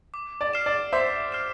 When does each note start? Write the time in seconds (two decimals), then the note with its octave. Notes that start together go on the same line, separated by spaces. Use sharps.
0.14 D6
0.41 D5
0.53 F6 C7 E7
0.66 D5
0.92 C5 E5 D6
1.32 F6 C7 E7